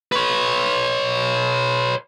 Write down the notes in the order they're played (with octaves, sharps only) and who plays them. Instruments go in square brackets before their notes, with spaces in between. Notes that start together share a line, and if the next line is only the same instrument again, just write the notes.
[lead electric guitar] B4 C#5